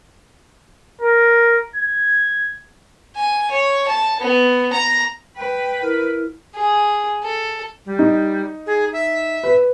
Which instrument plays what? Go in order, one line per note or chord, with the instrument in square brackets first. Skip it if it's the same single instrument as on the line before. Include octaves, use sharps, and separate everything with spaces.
[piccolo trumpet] A#4
G#6
[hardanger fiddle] G#5
C#5
A5
B3
A#5
[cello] B4 [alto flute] G5
[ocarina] E4 [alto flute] A#4
[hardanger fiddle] G#4
A4
[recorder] G3
[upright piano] D#4
[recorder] G#4
E5
[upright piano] B4